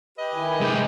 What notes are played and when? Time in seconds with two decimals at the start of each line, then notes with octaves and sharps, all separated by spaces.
0.18 G4 B4 D#5
0.34 D#3 E4 G#5
0.61 C3 E3 G#3 G6